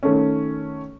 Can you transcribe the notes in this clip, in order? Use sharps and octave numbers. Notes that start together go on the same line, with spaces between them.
D#3 A3 C#4